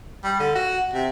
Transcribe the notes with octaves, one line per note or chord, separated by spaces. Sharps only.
G3
D3
F#4
C3